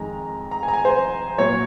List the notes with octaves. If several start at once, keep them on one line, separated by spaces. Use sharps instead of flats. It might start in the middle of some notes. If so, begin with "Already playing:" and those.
Already playing: F2 D#3 G#3 A#5
A#5
G#5
A#5
G#5
C5
A#2 F#3 C#5